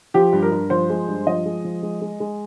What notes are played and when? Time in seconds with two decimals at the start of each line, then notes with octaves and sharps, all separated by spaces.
0.14 F3 G4
0.33 G2
0.43 A#4
0.52 G2
0.70 F3 C5
0.90 G#3
1.08 G2
1.27 F3 D#5
1.46 G#3
1.64 F3
1.83 G#3
2.02 G#3
2.20 G#3